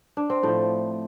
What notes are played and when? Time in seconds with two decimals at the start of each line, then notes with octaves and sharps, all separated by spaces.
0.17 D4
0.30 C4
0.43 A2 F3 A3